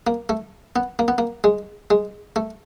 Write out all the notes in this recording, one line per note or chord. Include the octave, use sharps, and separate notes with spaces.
A#3
A3
B3
A#3
B3
A#3
G#3
G#3
A3